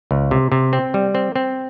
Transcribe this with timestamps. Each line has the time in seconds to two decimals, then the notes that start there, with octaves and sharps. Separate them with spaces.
0.11 C#2
0.31 C3
0.52 C3
0.73 C4
0.94 G3
1.15 C4
1.36 C4